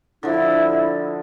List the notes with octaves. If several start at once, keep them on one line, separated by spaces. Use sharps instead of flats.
D3 F3 E4